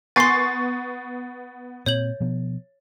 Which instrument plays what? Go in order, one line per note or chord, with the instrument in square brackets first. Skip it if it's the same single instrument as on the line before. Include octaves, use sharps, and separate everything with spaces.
[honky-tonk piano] B3 C#6 C7 [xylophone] G#5 C6 [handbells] A6
[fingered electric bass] A#2 C4 [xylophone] C#5 G6 F#7
[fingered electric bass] B2 F3 B3